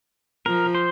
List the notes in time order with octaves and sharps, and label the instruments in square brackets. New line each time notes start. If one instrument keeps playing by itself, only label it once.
[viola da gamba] F3 [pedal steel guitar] A#4
[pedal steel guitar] C5